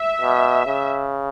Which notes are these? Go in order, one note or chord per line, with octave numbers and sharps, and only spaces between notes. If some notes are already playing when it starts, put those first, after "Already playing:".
Already playing: E5
B2
C#3